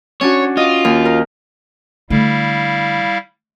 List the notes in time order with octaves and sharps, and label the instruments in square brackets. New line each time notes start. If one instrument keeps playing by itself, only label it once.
[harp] C#4 D4 F#4 [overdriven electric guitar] C#5
[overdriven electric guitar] F4 [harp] D#5
[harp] D#2
A#4
[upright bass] D3 A3 [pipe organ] G3 E4 F5